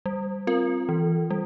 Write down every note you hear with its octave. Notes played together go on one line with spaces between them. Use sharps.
G3
C4 F4 A#4
E3
G3